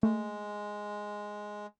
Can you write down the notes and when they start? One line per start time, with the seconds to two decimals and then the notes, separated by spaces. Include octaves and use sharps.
0.03 G#3 A3